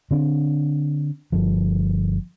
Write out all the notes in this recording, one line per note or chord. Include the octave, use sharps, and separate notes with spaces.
D3 C4 D4
G1 F3